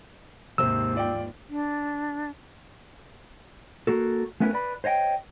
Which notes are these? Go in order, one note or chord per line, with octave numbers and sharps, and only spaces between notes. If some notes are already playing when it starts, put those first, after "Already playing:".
D#2 G#2 C3 C4 E6
F4 D5 G5
D4
A#3 F#4 A4
A3 B3 C#4 E4 A#4 B4
B4 D5 B5
C5 C#5 D#5 F#5 G5